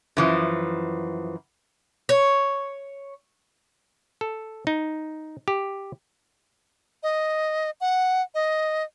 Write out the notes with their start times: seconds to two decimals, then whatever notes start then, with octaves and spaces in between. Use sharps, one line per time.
0.17 F#2 E3 F3
2.09 C#5
4.21 A4
4.67 D#4
5.48 G4
7.03 D#5
7.81 F#5
8.34 D#5